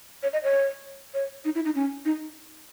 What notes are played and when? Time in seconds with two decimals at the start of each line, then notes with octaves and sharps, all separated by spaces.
0.23 C#5
0.33 D#5
0.44 C#5
1.14 C#5
1.45 D#4
1.55 E4
1.65 D#4
1.75 C#4
2.05 D#4